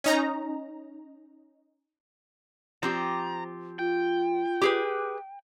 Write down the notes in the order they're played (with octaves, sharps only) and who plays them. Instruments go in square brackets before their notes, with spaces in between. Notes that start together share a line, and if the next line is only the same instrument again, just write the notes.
[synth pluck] C#4 D#4 A#5
[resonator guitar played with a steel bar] F3 C4 G4 [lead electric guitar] A#5
[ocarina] F4 [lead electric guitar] G5
[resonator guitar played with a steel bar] G4 G#4 B4